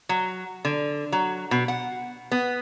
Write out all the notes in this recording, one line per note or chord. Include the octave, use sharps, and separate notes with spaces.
F#3
D3
F#3
B2
F#5
B3